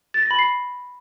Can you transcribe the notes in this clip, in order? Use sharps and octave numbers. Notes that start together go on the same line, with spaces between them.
A6
A#6
B5
C7